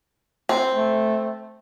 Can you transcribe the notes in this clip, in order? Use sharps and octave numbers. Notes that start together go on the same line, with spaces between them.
C4
A3